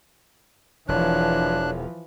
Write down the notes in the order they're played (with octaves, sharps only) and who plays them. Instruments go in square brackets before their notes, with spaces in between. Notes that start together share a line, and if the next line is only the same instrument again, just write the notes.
[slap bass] E1 [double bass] E3 F3 [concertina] D4 F#6 [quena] C#5